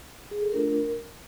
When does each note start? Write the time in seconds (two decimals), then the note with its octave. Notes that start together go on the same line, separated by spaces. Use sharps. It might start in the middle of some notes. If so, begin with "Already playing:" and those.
0.31 G#4
0.42 A4
0.52 A3 D4 F4 A#4